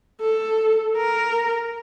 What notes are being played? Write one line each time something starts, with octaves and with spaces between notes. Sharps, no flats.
A4
A#4